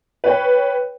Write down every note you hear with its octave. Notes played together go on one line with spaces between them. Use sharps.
B4 C#5 G5